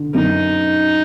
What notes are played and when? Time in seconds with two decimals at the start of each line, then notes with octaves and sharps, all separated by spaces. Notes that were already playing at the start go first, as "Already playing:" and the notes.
Already playing: D3
0.14 F#2 D#4